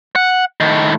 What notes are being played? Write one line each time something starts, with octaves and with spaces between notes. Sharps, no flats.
F#5
A2 D#3